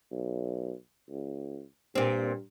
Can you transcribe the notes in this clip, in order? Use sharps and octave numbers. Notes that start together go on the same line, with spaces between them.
B1
C#2
G2 A#2 C4